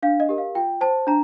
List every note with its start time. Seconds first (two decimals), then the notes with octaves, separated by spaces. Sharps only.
0.02 D4 F5
0.20 D#5
0.29 G4 A#4
0.38 F5
0.55 F4 G5
0.81 C5 A5
1.07 D4 A#5